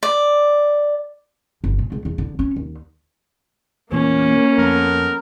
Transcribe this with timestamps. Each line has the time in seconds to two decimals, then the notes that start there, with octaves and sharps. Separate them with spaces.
0.03 D5
1.64 G1
1.79 A#2
1.92 C#2
2.05 E2
2.18 D3
2.39 C#4
2.56 D#2
3.92 E2 A#2 E3 A#3 C#4
4.58 F2 B3 A4 A#4